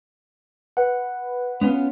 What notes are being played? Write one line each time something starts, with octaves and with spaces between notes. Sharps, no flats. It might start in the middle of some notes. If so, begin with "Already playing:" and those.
B4 F#5
B3 C#4 F4